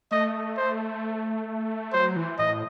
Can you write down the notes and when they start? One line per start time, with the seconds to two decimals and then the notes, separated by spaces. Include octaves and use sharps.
0.11 A3 D#5
0.57 C5
1.93 F#3 C5
2.16 E3
2.38 A2 D#5